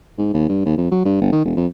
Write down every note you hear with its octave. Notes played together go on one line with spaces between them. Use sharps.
G#2
D#2
G2
D#2
F2
F#3
G2
G1
D#3
E1
F2